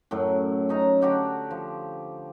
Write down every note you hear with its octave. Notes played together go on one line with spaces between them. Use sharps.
F#2 A2 F#3
C#4 D#4 A#5
D3 F#4 G4 F#5
F3